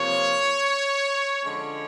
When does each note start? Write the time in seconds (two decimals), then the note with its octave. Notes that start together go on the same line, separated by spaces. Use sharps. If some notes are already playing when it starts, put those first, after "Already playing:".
Already playing: C3 F3 A#3 C#5
1.43 D3 F3 G#3 C#4 C#5